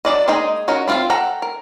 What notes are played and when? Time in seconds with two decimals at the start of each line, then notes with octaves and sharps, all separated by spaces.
0.05 F#3 D4 D5 D#5
0.28 G#3 A#3 D#4 G#4 D#5
0.68 C#4 D#4 F#4 A#4
0.88 B3 C4 F4 E5 F5
1.10 A4 F#5 G5 A#5
1.42 A#4